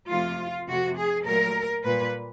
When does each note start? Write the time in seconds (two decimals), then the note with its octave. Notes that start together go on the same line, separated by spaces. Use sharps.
0.10 F2 C3 F3 A3 F4
0.68 F2 C3 F3 A3 F#4
0.97 G#4
1.25 A#2 F#3 A3 A#4
1.84 A#2 G3 B4